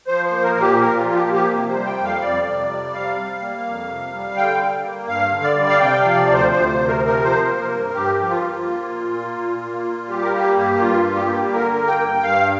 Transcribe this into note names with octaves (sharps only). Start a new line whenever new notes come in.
F3 C5
C5
A#3
A#4
A#2
G4
A#2 A#4
F4
F3
G4
A#3
G4
C3
C5
G3
G5
F2
F5
F2 D5
C3
G3
C3 F5
G3
A#3
F2
C3
G3
D3 G5
G3
A#3
G2 F5
D3
D5
G3
F5
C3 G5
F5
F3
D5
D2
C5
D2 C5
C5
C3
A#4
F3
A#4
F3 C5
A#3
A#4
G2
G2 G4
F3
F4
A#3
A#3
A#2
A#3
A#2
A#3
A#2
G3 G4
A#4
A#3 G4
G2 G4
G2 F4
G3
G4
A#3
D3 A#4
A#3
G5
G2
G2 F5